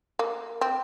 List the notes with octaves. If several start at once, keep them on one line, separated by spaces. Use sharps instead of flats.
A#3
C4